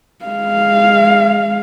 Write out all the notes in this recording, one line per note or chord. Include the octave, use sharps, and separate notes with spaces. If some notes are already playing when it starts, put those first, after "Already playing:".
G#3 F5